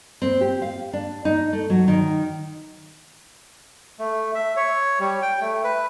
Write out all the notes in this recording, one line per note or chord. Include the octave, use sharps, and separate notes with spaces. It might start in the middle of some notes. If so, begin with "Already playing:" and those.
C4
G4
F5
D4
D#4
A3
F#3
D#3
A3
E5
C#5
G3
G5
A3
B4